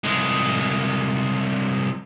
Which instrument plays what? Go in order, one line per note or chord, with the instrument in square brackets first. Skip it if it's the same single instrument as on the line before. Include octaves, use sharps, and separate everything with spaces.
[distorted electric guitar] C2 G#3